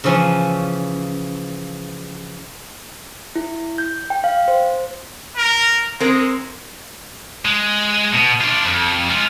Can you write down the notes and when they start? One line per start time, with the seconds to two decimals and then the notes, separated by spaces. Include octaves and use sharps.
0.04 C#3 E3 F3 C#4
3.35 E4
3.78 G6
4.10 G5
4.24 F5
4.48 C5
5.37 A#4
6.00 G#3 C4 A#4
7.45 G#3
8.14 B2
8.41 D4 F4
8.64 F2
9.09 G#3 F4